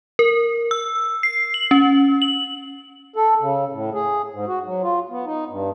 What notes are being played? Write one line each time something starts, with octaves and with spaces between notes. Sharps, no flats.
A#4
E6
C7
F#7
C#4
F#7
A4
C#3
A2
G#4
G#2
F#4
F#3
F4
B3
D#4
G2